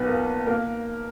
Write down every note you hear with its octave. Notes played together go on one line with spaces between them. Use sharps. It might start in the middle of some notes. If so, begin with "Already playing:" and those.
Already playing: B1 B3 B4
A#2 A#3
A#3 A#4